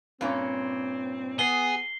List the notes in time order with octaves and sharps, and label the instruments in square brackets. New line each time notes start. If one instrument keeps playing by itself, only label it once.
[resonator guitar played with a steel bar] G2 A#2 C#4 [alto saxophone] C4
[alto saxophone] B3 [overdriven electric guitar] G#4 [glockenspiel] C7 G7